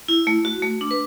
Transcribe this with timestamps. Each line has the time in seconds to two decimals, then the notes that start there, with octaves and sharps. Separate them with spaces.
0.08 E4
0.27 A3
0.45 F#4
0.62 A3
0.81 D4
0.91 B4